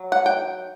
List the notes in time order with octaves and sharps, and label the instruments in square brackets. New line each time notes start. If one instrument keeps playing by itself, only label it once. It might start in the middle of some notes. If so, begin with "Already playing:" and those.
Already playing: [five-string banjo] F#3
F#5
G5